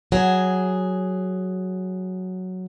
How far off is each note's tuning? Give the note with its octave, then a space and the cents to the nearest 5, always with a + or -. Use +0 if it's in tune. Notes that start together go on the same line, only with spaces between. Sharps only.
F#3 +0 G#4 +0